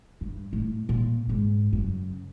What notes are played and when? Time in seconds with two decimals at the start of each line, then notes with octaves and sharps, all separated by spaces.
0.21 G2
0.53 A2
0.89 A#2
1.27 G#2 C#3
1.73 F#2 C#3